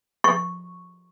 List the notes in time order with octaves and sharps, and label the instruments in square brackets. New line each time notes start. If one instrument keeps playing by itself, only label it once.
[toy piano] C#6